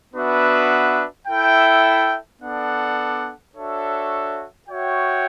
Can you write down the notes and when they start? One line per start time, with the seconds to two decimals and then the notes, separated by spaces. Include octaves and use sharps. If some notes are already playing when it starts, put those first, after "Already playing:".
0.14 B3 D4 F#4 B4 E5
1.28 E4 A4 E5 G5
2.42 B3 D4 A4 D5 F#5
3.55 D4 F#4 A4 C#5 E5
4.69 F#4 C#5 E5 G5